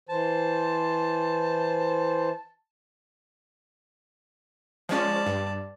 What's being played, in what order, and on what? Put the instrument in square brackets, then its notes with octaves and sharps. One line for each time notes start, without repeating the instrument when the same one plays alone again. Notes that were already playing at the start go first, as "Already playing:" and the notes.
[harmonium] E3 C5 [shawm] A5
[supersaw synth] F3 G#3 C#4 [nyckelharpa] D5 A5
[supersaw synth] G2